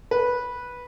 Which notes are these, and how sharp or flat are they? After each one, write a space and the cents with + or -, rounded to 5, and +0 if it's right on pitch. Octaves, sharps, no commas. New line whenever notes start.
B4 -10